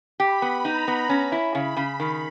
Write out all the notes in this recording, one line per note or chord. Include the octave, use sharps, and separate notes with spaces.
G4 B5
B3
D#4 A#5
B3
C#4
E4
C#3 B5
C#3
D#3 B5